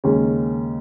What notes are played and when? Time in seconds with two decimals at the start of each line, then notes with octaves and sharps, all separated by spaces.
0.04 D#2 C#3 G#3 C#4